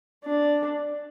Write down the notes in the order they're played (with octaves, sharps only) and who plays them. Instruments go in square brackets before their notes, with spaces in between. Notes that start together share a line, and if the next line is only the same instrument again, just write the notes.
[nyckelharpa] D4